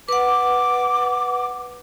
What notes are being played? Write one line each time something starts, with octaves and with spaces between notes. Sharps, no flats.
B4 F#5 D6